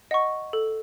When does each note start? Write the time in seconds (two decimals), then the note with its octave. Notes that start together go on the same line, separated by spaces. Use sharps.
0.11 D#5 F#5 C#6
0.53 A4